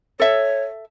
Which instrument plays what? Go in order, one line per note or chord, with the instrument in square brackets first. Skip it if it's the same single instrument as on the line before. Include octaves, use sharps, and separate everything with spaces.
[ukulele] A4 E5 [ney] C#5